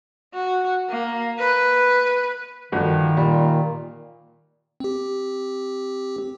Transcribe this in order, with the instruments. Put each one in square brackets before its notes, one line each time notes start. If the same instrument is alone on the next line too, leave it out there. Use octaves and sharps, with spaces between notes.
[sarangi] F#4
A#3
B4
[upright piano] G1 F3 F#4 [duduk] D#3
[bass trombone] A#2 [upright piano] G3
[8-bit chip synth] C4 G4